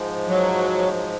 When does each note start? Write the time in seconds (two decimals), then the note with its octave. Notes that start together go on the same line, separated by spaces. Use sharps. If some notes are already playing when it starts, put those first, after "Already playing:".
Already playing: G#2 F3 G#3
0.28 F#3